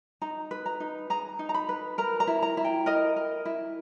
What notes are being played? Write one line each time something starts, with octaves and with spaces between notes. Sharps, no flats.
D#4 A#5
B4
A#5
D#4
G#4 A#5
D#4
A#5
B5
B4
A#4 A#5
A#5
E4
A#5
E4
G5
A#4 D#5
A#4
E4